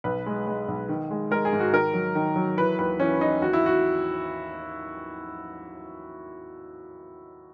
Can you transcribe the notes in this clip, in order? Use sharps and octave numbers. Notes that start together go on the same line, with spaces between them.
B1 B4
G#3
G#3
B1
D#3
G#3
G#3 A#4
G#4
G#2
F#4
D#3 A#4
F#3
D#3
F#3
E3 B4
D#2 B4
E3 C#4
E3 D#4
D#2 F#4
E4
F#4